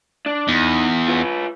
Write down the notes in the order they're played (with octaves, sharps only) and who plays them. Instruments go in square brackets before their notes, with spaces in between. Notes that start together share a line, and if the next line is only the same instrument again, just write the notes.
[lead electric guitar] D4
[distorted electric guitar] E2 [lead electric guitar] D#4
[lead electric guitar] F4 B4